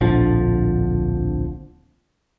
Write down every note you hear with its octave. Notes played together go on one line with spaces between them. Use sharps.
D1 A#1 D3 F3